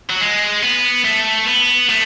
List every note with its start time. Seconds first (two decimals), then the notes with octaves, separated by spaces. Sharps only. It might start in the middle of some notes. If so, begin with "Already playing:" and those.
0.10 F#3
0.21 G#3
0.63 B3
1.05 A3
1.47 B3
1.89 A3